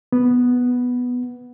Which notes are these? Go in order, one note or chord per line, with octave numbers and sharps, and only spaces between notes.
B3